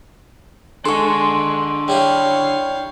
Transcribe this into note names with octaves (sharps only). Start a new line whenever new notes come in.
G#3 D4 A4 F#5 C6 C#6
G3 E4 G4 C#5 F5